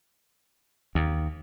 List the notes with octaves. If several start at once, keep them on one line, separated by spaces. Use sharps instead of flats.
D#2